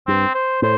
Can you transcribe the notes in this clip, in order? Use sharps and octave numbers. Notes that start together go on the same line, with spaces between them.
G2 C4
C5
A2 C5